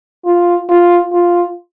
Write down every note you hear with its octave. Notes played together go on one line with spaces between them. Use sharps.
F4
F4
F4